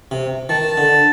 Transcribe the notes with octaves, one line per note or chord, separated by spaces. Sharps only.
C3
D#3 A5
D3